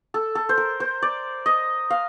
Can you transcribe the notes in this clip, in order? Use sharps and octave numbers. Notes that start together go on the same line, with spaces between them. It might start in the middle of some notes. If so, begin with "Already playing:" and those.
A4
A4
C5
A#4
C5
D5
D#5
F5